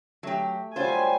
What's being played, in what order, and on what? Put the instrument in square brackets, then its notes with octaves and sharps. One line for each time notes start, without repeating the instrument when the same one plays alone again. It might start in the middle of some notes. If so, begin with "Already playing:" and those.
[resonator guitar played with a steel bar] F#3 G4 [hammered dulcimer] A3
[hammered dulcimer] F#3 G3 G4 [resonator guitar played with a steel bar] F4 C5 [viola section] G#5